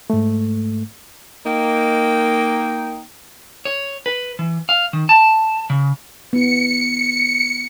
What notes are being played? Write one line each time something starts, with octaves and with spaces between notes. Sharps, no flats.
G#2 A3
A#3 D#4 G5
C#5
B4
E3
F5
D#3
A5
C#3
B3 E4 C#7